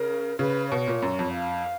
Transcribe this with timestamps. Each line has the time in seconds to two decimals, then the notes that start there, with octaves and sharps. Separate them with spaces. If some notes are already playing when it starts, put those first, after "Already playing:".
Already playing: C#3 A#4
0.39 C#3 B4
0.71 B2 C#5
0.87 A#2
1.02 F#2
1.19 F2
1.34 F5